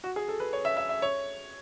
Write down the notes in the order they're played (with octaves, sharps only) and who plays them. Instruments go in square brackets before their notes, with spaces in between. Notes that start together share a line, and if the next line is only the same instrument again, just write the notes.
[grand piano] F#4
G#4
A4
B4
C#5
E5
E5
E5
C#5